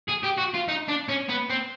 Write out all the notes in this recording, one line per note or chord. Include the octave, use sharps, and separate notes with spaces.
G#4
G4
F#4
F4
D#4
D4
C#4
B3
C4